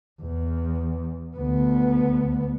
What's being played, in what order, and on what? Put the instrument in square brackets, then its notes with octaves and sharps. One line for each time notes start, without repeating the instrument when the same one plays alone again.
[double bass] E2
D2 B3